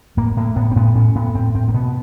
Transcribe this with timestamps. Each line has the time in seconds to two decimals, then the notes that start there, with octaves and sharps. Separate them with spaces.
0.17 A2 A#3
0.37 A2 A#3
0.56 A2 B3
0.72 C4
0.76 A2 B3
0.95 A2 C#4
1.15 A2 B3
1.35 A2 C4
1.55 A2 C4
1.68 A#3
1.74 B2 B3